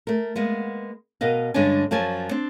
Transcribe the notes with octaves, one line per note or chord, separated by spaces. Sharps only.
A3 A#4
G#3 A#3 B3
B2 A#4 D#5 F5
G2 D3 G#3 C#4 D4 G#5
F#2 F3 D5 G#5 A5
C4 D4